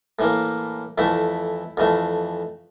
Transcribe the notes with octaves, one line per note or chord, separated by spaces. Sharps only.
A2 E3 A#3
F2 E3 A3 E4
F2 E3 A3